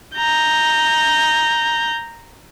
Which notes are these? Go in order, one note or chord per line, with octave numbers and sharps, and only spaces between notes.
A#5 G6